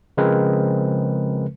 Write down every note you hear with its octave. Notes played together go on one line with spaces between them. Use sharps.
C#3 F3 G#3 C4 A#4 B4